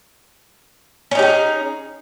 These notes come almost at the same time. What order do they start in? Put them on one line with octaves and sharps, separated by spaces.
C#4 D#4 G4 G#4